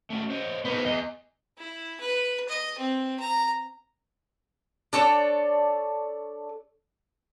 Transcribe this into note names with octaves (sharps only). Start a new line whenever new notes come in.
A3 C#4 F#4
C5 C#5 D#5
B3 D#4 A#4 C5
E2 D#5
E4
B4
D#5
C4
A#5
D4 A4 C#5 D5